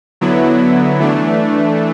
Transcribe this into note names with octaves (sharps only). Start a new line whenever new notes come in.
D3 F#3 B3 E4
E3 A3 D4